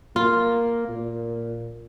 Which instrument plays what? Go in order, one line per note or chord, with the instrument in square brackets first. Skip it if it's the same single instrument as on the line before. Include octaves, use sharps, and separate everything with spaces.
[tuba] A#3 [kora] F4
[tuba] A#2